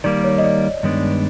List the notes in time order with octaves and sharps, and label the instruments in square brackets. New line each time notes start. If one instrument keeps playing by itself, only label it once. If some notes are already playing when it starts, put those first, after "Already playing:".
[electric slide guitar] D#3 G3 A#3 [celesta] D5
[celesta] C#5
D#5
D5
[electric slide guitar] G2 D#3 G#3 B3 D4